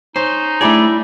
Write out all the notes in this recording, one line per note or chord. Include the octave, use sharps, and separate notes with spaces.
C#4 D#4 C5
G3 A3 D4 E4 G#4 D5